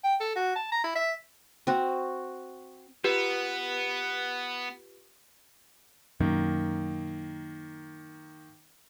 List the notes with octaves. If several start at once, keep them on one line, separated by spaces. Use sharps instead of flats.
G5
A4
F#4
A5
A#5
E4
E5
C4 F#4
B3 F4 G4 B4
F#2 B2 D#3 A#3